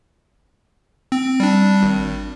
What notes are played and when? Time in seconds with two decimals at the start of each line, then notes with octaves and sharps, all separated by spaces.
1.12 C4
1.40 G3 D4
1.83 G#1